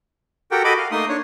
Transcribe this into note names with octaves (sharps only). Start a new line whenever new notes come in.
F#4 G4 A4 A#4 F#5 G5
F#4 A4 D#5 B5 D6
F5
A3 A#3 D#4 C6 D#6
D4 C#5